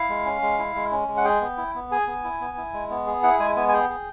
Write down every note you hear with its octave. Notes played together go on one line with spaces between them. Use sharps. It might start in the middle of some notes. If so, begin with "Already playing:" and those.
Already playing: E4 F5
G#3
C#4
G#3
E4
G#3
C#4
G#3
F#5
G#4 G5
B3
E4
B3
G#4 G#5
B3
E4
B3
E4
G#3
B3
G#4
E4 F#5
G#3 G#5
B3 G#5
G#5
G#4 G5
G#4